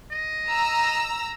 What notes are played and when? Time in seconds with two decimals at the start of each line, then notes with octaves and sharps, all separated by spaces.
0.12 D#5
0.48 A#5 E6